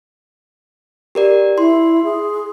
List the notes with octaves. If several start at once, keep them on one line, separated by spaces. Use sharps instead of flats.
G4 A#4 D5
E4 C6
G#4